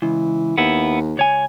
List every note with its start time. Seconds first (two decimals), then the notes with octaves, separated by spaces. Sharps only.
0.02 C#2 E3
0.58 D#2 B3 E4
1.17 C#2 C#5 G#5